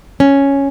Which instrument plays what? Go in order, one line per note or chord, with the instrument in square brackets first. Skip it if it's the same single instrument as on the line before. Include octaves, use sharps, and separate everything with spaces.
[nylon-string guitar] C#4